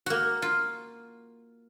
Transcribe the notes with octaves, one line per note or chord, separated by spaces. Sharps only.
A#3 F#4
F4